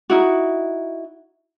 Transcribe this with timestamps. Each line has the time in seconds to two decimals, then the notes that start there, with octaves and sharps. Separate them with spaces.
0.10 D#4 E4 F#4